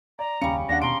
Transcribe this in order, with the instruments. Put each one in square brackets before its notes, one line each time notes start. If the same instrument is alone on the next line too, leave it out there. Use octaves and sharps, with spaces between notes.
[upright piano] D5 [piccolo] A#5
[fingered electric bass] F#1 D#2 C#4 [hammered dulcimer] C#3 G3 [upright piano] C#7
[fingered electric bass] D#2 [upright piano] D4 F#5 [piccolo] A#6
[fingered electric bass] D#1 B2 [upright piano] A#5 D7 [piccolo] C6